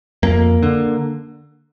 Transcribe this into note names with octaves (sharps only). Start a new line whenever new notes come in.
F2 A#3
D3